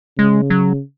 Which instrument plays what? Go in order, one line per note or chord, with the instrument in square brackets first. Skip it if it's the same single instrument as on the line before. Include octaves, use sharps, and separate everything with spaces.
[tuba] C#3 [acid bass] G#3
[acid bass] F#3